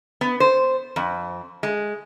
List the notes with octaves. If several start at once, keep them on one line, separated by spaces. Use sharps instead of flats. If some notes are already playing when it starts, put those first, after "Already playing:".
B3
C5
F2
G#3